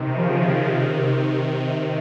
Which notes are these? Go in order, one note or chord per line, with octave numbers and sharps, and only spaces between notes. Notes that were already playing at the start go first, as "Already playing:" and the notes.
Already playing: C3 D#3
C#3 F3
C3 D#3